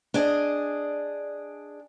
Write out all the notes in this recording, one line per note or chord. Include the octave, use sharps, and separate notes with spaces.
D4 G#4 D5 D#5